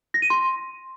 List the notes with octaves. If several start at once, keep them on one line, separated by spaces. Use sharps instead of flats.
A#6
D#7
C6